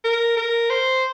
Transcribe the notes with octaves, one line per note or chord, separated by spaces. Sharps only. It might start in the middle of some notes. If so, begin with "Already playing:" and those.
A#4
A#4
C5